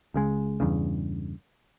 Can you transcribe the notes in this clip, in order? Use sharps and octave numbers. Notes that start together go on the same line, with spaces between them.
C#2 C#3 G#3
E2 G2 C#3